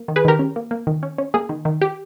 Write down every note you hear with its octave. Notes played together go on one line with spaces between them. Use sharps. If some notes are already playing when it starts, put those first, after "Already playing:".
Already playing: A#3
D#3
G#4 B4
D#3 G4 A#4
C#4
A#3
A#3
D#3
C#4
C#4
A#3 G#4
D#3
D#3
G4